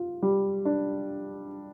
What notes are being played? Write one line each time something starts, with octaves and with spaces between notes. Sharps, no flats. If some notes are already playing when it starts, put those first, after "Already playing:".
Already playing: F4
G3
D4